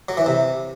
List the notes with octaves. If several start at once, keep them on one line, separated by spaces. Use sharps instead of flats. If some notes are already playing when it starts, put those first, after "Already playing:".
F#3
E3
C3